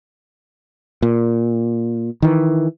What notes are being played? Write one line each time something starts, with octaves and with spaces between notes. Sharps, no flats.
A#2
D#3 E3